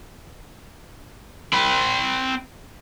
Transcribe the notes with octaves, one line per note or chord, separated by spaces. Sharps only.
C4 B5